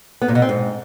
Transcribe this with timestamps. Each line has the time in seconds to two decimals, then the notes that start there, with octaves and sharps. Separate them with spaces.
0.22 B3
0.28 A#2
0.35 B2
0.42 C4
0.49 G#2